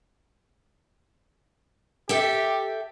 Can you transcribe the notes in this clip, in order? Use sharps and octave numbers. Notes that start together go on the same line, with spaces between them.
G4 A4 E5 G5